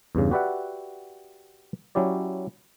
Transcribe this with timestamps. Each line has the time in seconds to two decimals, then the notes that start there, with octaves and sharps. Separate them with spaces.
0.15 E2 G2 C#3
0.31 F#4 G4 B4 D5 E5 F#5
1.95 F#3 C#4 E4 G4 D5